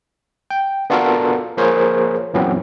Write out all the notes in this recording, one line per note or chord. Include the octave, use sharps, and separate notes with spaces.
G5
B3 D4 F4 F#4 A4 A#4
F3 A#3 G#4 A#4 C5 C#5
F#2 A#2 E3 F#3 B3 C4